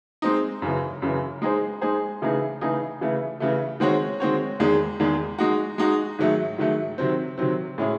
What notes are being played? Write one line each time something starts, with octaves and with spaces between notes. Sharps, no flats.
G#3 C4 D#4
F#2 C#3 E3
F#2 C#3 E3
G#3 D#4 G#4 C5
G#3 D#4 G#4 C5
C#3 E3 A3 D#4 G#4
C#3 E3 A3 D#4 G#4
C#3 E3 A3
C#3 E3 A3
D#3 G#3 C4 F#4 C#5
D#3 G#3 C4 F#4 C#5
E2 D#3 G#3
E2 D#3 G#3
G#3 D#4 F#4
G#3 D#4 F#4
G#2 D#3 F#3 A3
G#2 D#3 F#3 A3
C3 D#3 F#3 C4
C3 D#3 F#3 C4
A2 G#3 C#4 E4 G#4